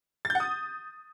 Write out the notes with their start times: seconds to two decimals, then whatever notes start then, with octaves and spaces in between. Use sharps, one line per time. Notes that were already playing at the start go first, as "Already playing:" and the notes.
0.25 A6
0.30 G6
0.35 F#5
0.40 D#6